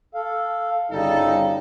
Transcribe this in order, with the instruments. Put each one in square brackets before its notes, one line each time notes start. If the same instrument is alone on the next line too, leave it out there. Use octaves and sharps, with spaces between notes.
[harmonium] A4 F5
[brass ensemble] G1 D#4 A4 [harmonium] C#3 G3